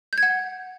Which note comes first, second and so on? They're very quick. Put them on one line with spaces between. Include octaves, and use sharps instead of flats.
G6 G#6 F#5